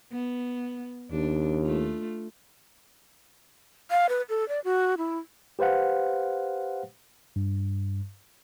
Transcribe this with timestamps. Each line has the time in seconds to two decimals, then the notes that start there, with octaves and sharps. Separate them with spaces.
0.12 B3
1.11 D#2 D4
1.63 A3 F4
3.91 F5
4.09 B4
4.29 A4
4.49 D5
4.65 F#4
4.98 E4
5.59 G4 B4 C5 F5 F#5
7.36 G2